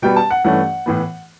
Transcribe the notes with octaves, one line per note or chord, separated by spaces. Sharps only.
B2 G3 B3 G5
A5
F#5
G2 E3 A3 C#4 F#5
A2 E3 B3